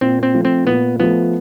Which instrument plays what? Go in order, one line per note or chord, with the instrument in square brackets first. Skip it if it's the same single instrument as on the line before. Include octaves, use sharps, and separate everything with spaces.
[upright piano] A#2 [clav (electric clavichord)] C4
[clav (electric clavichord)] C4
[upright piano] F3 A3
[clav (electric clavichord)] C4
[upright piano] A#2 [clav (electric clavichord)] B3
[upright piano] F3 A3 [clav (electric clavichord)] B3